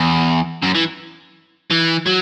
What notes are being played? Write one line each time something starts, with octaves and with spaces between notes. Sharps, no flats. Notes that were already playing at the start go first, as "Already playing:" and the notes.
Already playing: E2
F#2
E3
E3
F#3